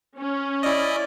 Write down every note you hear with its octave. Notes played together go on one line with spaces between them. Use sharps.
C#4
E4 D5 D#5